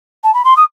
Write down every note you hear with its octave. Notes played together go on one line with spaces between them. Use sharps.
A5
B5
C6
D#6